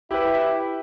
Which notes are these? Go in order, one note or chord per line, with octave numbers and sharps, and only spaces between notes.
E4 G4 B4